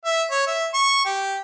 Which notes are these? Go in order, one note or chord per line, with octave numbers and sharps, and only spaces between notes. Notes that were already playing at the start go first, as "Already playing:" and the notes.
E5
C#5
E5
C#6
G4